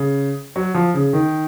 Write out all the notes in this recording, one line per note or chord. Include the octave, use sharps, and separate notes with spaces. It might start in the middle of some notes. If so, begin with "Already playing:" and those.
Already playing: C#3
F#3
F3
C#3
D#3